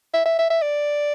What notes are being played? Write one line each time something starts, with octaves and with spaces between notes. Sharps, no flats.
E5
E5
E5
E5
D5